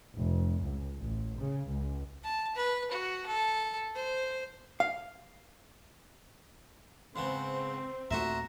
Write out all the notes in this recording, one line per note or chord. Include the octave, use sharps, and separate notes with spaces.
F1
C#2
A1
C#3
C#2
A5
B4
F#4
A4
C5
F5
G#2 C#3 B3 C4 C6
D#2 A#2 A3 F#4 C5 E5 A#5